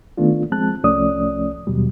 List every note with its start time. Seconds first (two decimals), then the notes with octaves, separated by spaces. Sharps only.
0.17 D#3 A3 B3 D4 F4
0.51 F3 G#3 C4 A5 F#6
0.84 C2 F3 A3 C#4 D5 D#6
1.67 D#2 B2 F#3 G3